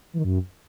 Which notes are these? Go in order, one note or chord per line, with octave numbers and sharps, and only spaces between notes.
E3
D#3
F#2